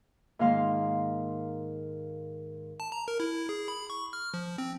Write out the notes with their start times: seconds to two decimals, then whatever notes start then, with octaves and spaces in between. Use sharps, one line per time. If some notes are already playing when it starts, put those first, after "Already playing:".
0.39 G#2 D#3 A#3 F5 C6
2.80 A5
2.92 A#5
3.08 A#4
3.20 E4
3.49 G#4
3.68 B5
3.90 C#6
4.13 F6
4.34 F3
4.58 C4